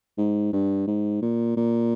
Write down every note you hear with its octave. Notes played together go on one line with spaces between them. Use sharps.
G#2
G2
G#2
A#2
A#2